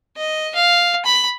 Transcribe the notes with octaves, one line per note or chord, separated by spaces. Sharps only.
D#5
F5
B5